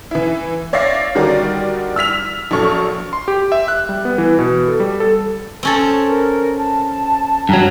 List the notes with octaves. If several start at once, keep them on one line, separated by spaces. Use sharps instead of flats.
E3 E4
C#5 D5 E5 F5 A#6 C7
D3 D#3 G3 F#4 A#4 D5
E6 F6 B6 F7
A#1 F#3 A4 C#6 F6
C6
G4
E5
F#6
G3
B3
E3
B2
A4
G3
A4
C4 C#4 A4
A#4
A5
G2 F#3 A#5